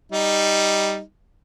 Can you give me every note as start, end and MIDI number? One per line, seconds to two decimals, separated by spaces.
0.12 1.00 55
0.12 1.00 63